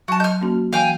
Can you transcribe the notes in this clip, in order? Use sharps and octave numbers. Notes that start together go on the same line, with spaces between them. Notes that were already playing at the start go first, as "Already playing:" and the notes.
F#3 F#4 A5
D#5 F6 G6
A#3 C#4 F#4
E3 F5 G5 G#5